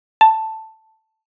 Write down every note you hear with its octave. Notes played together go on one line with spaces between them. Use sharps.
A5